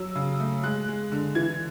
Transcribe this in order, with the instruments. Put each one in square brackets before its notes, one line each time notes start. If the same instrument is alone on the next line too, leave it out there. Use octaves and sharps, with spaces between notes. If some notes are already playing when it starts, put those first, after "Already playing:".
Already playing: [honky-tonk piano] F#3 E6
C#3
A3
G#3 F#6
G#3
D3
E3 G#6